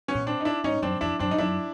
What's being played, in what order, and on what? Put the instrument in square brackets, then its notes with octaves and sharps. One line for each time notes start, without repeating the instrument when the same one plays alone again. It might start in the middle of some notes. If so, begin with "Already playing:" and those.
[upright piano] B3 C#4
[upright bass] A#2
[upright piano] C4 D4
D#4
D4 E4
[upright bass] G#2 [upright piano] C#4 D#4
[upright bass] F#2 [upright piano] C4 D4
[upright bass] F2 [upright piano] D4 E4
[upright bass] F#2 [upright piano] C4 D4
[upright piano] D#4
[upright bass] F#2 [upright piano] D4 E4